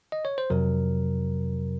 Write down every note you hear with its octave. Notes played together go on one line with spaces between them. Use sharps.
D#5
C#5
C5
F2 C3 F#3 A#4